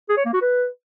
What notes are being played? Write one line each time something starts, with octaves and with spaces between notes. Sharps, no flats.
G#4
C#5
A#3
F#4
B4